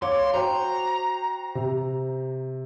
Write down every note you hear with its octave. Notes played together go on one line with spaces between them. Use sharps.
C#5 F5 C6 D6
F#4 C5 G5 A#5
C3